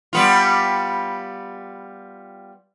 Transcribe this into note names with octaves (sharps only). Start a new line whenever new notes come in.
G3 B3 F4